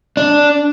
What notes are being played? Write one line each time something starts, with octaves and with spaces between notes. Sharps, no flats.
D4